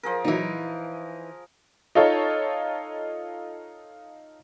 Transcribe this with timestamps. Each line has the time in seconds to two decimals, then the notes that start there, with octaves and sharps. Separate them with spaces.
0.03 F3 G#4 A#4
0.24 A#2 E3 F#3 D#4 E4
1.95 D#4 F4 A4 C#5